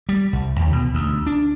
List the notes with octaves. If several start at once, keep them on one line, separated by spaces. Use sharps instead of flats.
G3
C2
D#2
B2
D2
D4